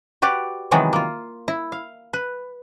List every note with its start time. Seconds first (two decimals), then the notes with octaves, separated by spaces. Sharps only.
0.22 F#4 G4 B4 D5
0.71 C3 D#3 E3 F#3 G#3 B3
0.93 A#3 F4
1.48 E4
1.72 F5
2.13 B4